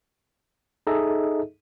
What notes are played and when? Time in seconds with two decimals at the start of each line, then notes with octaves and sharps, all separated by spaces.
0.87 D#4 G#4 A4 D#5 E5